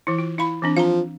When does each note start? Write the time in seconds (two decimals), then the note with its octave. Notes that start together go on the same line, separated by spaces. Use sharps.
0.07 E3 E4
0.18 F4
0.38 E4 F5 B5
0.62 E3 C4 D4
0.77 F3 F5 A#5